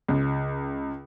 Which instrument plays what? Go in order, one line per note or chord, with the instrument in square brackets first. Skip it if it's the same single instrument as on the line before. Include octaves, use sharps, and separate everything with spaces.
[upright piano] C#2